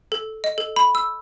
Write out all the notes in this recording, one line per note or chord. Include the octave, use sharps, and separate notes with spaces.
A4
D#5
A4
B5
E6